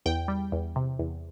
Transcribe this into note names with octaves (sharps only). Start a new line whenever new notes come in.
E2 G5
G3
E2
C3
E2